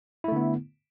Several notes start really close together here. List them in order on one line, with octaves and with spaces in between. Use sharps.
E4 A3 D3 B3